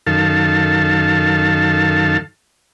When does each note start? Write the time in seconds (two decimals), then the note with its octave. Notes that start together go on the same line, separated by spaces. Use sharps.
0.06 F#2 D#3 A4 F5 A5